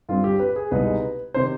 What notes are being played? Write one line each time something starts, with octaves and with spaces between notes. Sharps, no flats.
G2 D3 G3 C4 F4
G4
B4
G#4
C2 B2 G#3 B3 D#4 B4
C3 D#3 C5